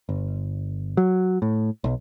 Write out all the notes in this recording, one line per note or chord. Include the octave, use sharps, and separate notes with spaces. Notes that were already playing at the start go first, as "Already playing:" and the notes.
G1
F#3
A2
B1